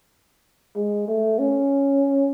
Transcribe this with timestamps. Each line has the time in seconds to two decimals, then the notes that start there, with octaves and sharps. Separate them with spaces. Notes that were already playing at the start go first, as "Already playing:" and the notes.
0.76 G#3
1.08 A3
1.39 C#4